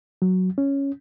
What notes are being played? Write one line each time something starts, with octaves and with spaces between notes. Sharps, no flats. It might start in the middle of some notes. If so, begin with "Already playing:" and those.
F#3
C#4